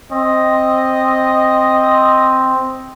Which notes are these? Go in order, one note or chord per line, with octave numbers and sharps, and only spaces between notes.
C4 D#5